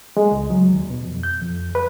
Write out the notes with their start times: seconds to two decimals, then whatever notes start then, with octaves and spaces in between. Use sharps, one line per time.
0.17 G#3
0.32 C#2
0.50 F#3
0.72 D#2
0.90 B2
1.04 F2
1.23 G6
1.41 F2
1.75 B4